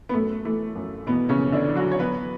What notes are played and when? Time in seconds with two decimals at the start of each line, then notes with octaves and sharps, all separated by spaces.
0.09 B3
0.14 F#2 A3
0.45 E3 A3
0.75 F#2
1.06 B2 E3 B3
1.29 C#3 C#4
1.38 F#2
1.52 D3 D4
1.68 E3
1.75 F#3 F#4
1.92 C#5
1.99 F#3 B3 B4